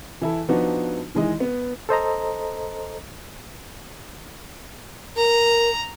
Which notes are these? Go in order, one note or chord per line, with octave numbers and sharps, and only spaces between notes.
E3 E4 A4
F3 B3 D4 D#4 F#4 B4
D#3 E3 G#3 D#5
B3
A4 C5 D#5 A#5
A#4 A#5